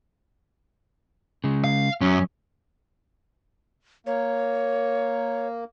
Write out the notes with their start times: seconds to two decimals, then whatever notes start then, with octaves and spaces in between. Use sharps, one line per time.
1.44 C#3 G#3
1.64 F5
2.01 F#2 C#4
4.07 A#3 C#5